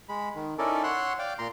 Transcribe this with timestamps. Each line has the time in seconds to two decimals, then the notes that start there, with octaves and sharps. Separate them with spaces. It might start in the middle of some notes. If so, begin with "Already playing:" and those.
0.09 G#3 B5
0.35 D#3
0.58 C#4 D#4 E4 A4 A#4 D5
0.83 C#5 F#5 C6 E6 F#6
1.19 D5 F5 G5 D6
1.39 A#2 A#5 C6